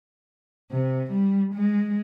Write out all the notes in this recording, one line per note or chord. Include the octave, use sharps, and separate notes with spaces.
C3
G3
G#3